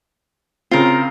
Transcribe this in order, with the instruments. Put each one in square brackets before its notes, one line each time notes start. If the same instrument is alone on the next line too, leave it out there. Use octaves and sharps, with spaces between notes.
[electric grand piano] C#3 C4 [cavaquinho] F4 A#4